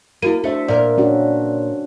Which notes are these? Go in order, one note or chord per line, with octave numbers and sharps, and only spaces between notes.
A#3 E4 F#4 D#7
A3 D4 C5 E5
A#2 A#4 D5
C#4 D4 F#4